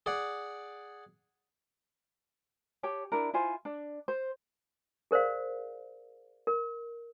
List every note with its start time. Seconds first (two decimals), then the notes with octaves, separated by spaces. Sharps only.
0.06 G#4 D5 F#5
2.83 G4 C#5 A5
3.12 D4 E4 A#4
3.34 E4 F4 C5 G#5
3.65 D4
4.08 C5
5.11 G#4 A#4 C5 D5 F5
6.47 A#4